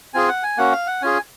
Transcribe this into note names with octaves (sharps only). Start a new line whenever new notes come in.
C4 F4 G#4 G#5
F#5
G#5
A#3 C#4 F#4 F#5
F5
F#5
C#4 F4 G#4 G#5